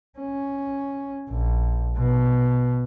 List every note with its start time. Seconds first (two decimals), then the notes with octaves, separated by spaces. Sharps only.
0.19 C#4
1.29 A#1
1.97 B2